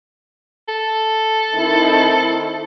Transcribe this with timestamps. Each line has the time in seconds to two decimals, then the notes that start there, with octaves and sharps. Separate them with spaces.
0.68 A4
1.55 D#3 C4 E4